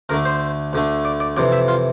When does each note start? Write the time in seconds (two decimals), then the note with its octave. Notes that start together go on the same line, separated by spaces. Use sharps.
0.09 D2 D3 A3 A#4
0.25 C5
0.73 D2 D3 A3
1.05 D5
1.20 D5
1.37 F2 C3 E3 D5
1.52 E5
1.68 F4